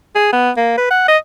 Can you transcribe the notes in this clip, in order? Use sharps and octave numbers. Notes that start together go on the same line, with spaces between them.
G#4
B3
A#3
B4
F#5
D#5